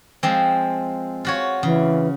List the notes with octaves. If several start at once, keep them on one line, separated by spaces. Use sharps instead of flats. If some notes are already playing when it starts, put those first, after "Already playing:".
F3 G#3 C4
F4 F#4 C#5
C#3 E3